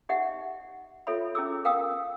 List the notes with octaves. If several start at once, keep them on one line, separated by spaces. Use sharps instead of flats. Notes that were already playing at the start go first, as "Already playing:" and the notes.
D#4 G4 D#5 E5 F#5
F4 A4 C#5 E5 B5
C#4 E4 G#4 D6 E6
A#4 F5 G5 D#6 E6